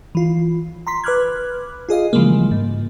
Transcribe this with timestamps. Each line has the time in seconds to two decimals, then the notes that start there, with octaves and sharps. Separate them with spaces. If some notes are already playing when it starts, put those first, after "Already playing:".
0.15 E3 F4
0.87 A#5 C6 B6
1.04 B4 B5 D6 F6 F#6 G#6
1.89 F4 G#4 D#5 F5
2.13 C#3 E3 F3 G3 G#3 A#3
2.51 G#2